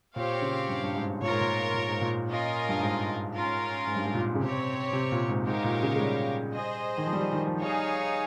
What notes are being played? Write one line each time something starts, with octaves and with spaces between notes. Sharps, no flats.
A#2 C4 G4 C#5 F5
C#3
G2
G2
G#2
A#2 F4 A#4 C#5
G#2
A#2
A#2
G#2
A#2
C#4 F4 A#4 D#5
G2
G#2
C#4 F4 A#4
G#2
G2
G#2
A#2
C#3
C3 C4 G4 C#5
C3
A#2
G#2
G#2 D#4 G4 A#4 C#5 F5
A#2
C#3
G#3
G3
G#4 C5 D#5
D#3
F3
G3
F3
D#3
F3
G3 D#4 G#4 C#5 F5 G#5